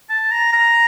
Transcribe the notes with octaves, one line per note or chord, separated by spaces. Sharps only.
A5
A#5
A#5